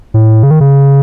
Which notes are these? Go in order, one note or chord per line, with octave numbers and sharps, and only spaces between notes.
A2
C#3
D#3
C#3